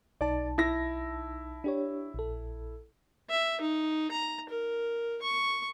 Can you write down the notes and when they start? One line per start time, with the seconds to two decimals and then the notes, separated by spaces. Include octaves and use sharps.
0.21 B1 D#4 D5 A5
0.58 E4 A#6
1.64 D4 G4 C#5
2.14 A#1 A4
3.30 E5
3.61 D#4
4.11 A#5
4.49 A#4
5.22 C#6